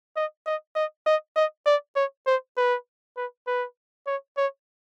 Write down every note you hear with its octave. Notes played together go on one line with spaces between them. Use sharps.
D#5
D#5
D#5
D#5
D#5
D5
C#5
C5
B4
B4
B4
C#5
C#5